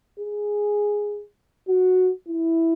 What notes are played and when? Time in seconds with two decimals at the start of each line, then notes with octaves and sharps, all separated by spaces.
0.20 G#4
1.68 F#4
2.29 E4